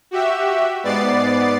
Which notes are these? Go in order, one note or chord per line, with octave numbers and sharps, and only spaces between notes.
F#4 G4 E5
G#2 B3 D5 D6 A6 C7